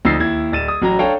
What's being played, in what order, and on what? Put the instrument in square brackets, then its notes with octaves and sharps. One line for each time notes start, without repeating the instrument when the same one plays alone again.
[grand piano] D2 F3 D#4 E6 A6 C7
D#2 E4 G#6
D1 A6 D#7 E7
D#6
A1 F#3 A#5
D4 A4 C#5 F5 G5 A#5